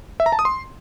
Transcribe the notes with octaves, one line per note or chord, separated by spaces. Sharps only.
E5
A#5
A5
D#6
C6